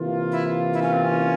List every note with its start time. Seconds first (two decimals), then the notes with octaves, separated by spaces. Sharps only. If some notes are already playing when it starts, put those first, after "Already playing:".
Already playing: C3 E3 A#3 F4
0.32 E4
0.73 E4
0.82 C#4
0.93 C4
1.02 C#4